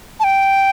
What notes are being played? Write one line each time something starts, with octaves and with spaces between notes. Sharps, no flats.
A5
G5